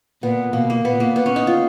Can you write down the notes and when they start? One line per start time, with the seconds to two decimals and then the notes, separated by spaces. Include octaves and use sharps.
0.22 A#2 B3
0.53 B2 A#3
0.70 A#3
0.85 A#2 B3
1.00 A#3
1.16 B3
1.26 C#4
1.36 D#4
1.47 F4